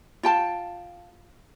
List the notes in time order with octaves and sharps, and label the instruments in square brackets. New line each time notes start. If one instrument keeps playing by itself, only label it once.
[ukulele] F4 G5 A5